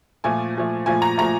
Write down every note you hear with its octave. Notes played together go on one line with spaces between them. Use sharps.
A#2 F3 A3 G#5
A#2 F3 A3
A#2 F3 A3 G#5
A#5
A#2 F3 A3 A#5